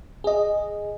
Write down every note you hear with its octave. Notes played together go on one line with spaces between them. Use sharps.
G#4 D#5